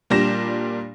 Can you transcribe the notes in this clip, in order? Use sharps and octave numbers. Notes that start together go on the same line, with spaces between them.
A#2 G3 D4 G4 A#6 E7